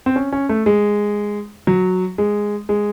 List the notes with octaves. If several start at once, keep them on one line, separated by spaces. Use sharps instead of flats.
C4
C#4
C#4
A3
G#3
F#3
G#3
G#3